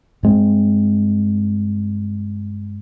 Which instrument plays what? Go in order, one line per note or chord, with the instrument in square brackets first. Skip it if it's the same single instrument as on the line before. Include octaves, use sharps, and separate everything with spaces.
[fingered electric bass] G2 G#3 C4